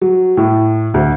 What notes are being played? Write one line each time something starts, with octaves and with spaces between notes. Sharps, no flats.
F#3
A2
D2